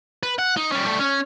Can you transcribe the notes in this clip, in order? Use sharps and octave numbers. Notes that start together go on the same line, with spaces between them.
B4
F#5
D#4
G3 C#4
G3 A3
C#4